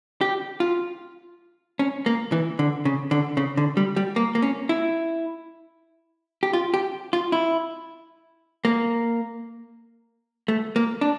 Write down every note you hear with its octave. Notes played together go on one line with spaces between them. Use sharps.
G4
F4
C#4
A#3
E3
D3
C#3
D3
C#3
D3
G3
G3
A#3
A#3
C#4
E4
G4
F4
G4
F4
E4
A#3
A3
A#3
D4